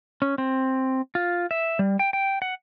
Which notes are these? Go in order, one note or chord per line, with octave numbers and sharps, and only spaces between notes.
C#4
C4
F4
E5
G3
G5
G5
F#5